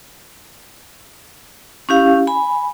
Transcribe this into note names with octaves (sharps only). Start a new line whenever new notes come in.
C#4 E4 G4 F5
G#5 B5